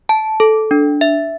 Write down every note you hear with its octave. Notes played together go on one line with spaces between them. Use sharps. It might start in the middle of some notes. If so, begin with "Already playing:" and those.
A5
A4
D4
E5